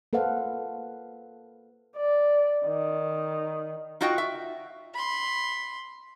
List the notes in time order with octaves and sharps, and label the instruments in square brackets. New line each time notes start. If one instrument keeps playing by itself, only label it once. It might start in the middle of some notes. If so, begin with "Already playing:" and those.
[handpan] A#3 A4 B4 C5 F5 F#5
[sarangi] D5
D#3
[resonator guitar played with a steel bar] D#4 F4 F#4 D#5 F#5 G5
E5
[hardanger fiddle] B5 C6